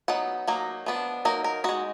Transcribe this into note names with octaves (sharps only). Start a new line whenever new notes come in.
F#3 B3 D#4 F#5
F#3 A#3 D#4
F3 B3 D4
F#3 A#3 D#4 A#4
A#4
G#3 D#4 F#4